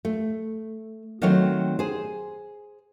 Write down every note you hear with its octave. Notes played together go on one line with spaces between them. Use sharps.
A3
D#3 F#3 A3 C4 C#5
G#4 C5